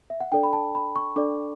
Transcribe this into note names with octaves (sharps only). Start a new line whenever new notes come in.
E5
F#5
D4 A4 D5 G5
B5
A5
B5
C#6
D4 A4 D5 D6